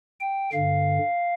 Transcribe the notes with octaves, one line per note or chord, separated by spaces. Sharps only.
G5
G2 D3 F5